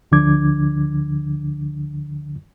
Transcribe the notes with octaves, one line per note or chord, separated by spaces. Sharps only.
D2 D3 F3 D4 D6 G#6